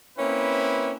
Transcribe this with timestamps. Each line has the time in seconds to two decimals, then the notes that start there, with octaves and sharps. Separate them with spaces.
0.18 A#3 C4 C#4 E4 B4